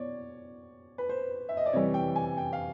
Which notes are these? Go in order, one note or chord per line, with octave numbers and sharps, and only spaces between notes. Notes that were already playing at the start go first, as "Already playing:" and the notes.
Already playing: B2 C#5 D5
B4
C5
E5
D#5
D5
C3 E3 G3 C#5
G5
G#5
G5
F5